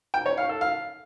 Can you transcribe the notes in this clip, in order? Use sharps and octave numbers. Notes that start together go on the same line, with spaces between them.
G5
C#5
F5
A4
F5